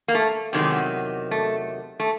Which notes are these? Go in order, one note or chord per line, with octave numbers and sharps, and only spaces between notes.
A#3
A3
E2 C3 D#3 F#3 G#3
A3
A3